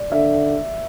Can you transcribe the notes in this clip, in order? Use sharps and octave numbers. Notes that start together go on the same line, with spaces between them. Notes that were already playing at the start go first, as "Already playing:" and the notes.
Already playing: D5
D3 E5